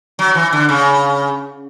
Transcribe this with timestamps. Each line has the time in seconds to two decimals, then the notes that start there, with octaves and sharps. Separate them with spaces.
0.19 F#3
0.35 E3
0.53 D3
0.69 C#3